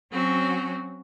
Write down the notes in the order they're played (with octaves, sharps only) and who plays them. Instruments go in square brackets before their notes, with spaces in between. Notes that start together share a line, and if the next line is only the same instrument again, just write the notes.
[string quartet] F#3 C4 C#4 F#4